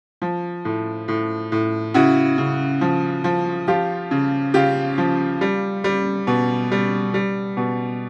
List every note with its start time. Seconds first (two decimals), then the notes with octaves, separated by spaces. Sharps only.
0.22 F3
0.65 A2
1.08 A2
1.52 A2
1.94 C#3 E4 F#4
2.38 C#3
2.81 F3
3.24 F3
3.68 F3 F4 G4
4.11 C#3
4.54 C#3 F4 G4
4.98 F3
5.41 G3
5.84 G3
6.27 B2
6.72 G3
7.14 G3
7.57 B2